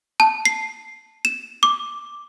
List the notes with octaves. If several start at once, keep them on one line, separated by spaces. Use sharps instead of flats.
A5
C7
E7
D6